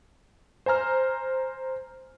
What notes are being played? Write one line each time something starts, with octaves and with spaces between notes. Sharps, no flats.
C5 G#5 A#5 F6